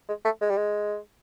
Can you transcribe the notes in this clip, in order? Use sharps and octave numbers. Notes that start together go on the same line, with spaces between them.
G#3
A3
G#3
G3
G#3